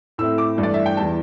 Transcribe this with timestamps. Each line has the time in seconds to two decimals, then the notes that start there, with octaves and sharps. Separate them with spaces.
0.18 A2 A3 C4 E4 E6
0.38 D6
0.57 G2 E3 A3 D4
0.63 D5
0.74 E5
0.86 G5
0.97 E2 E3 G3 A5